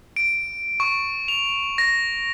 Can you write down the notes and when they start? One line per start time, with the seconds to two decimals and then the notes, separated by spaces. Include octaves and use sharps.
0.16 D7
0.80 C#6
1.28 F7
1.78 A#6